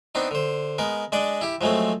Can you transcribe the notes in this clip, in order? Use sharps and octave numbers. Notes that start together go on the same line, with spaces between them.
B3 C4 D4 D#4
D3 C5
G#3 B3 A#4
G#3 D4 D5 D#5
E4 G4
F3 F#3 G#3 A3 C4